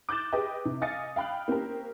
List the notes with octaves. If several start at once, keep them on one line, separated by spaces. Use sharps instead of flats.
D6 F#6 G6 A6 E7
G4 G#4 B4 D#5 G5
C3
D#5 F5 G#5 D#6 A6 C#7
F5 G5 B5 F6 F#6
A#3 C4 C#4 G4 A#4